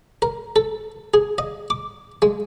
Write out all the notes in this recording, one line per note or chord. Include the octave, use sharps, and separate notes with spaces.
A#4
A4
G#4
D#5
D6
G#3